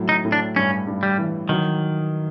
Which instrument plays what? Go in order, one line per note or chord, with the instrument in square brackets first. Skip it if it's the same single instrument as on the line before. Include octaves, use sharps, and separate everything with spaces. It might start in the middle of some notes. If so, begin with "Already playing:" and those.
Already playing: [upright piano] A2 F#3
[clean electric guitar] D#4
[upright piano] A2
[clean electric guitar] D4
[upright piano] G2 [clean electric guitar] C#4
[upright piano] G2
[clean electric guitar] G3
[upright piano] E3
[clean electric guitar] D#3 [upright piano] F#3